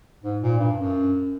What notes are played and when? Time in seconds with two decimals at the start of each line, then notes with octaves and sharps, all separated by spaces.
0.23 G#2
0.42 A#2
0.59 G2
0.77 F#2